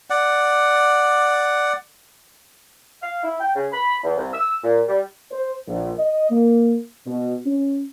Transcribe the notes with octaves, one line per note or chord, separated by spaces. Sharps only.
D5 F#5
F5
E4
G5
C#3
B5
E2
C2
E6
A#2
G3
C5
A#1
D#5
A#3
B2
C#4